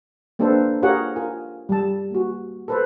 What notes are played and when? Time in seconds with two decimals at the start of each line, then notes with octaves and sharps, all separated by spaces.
0.39 A#3 C4 D4 A4 B4 C5
0.82 F4 G4 G#4 A#4 C#5 F#5
1.16 F4 A#4 G#5
1.69 G3 A5
2.11 A#3 F#4
2.68 A4 B4 C5